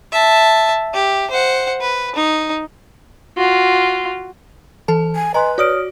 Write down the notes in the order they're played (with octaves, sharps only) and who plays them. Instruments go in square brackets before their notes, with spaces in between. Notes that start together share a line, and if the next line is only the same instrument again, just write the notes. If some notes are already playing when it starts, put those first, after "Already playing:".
[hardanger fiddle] E5 A5
G4
C5 F#5
B4
D#4
[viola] F4 F#4
[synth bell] E3 A4 A5
[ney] G#5
[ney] B4 [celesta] D#5 G#5 C6 [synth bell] A#5
[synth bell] F#4 D5 D7 [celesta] C#5 D#6 F6